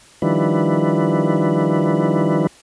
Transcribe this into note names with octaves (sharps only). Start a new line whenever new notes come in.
D#3 F3 G3 D4 E4 B4